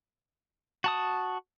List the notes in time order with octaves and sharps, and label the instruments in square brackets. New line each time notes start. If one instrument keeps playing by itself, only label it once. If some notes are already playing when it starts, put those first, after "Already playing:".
[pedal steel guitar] F#4 A5 D#6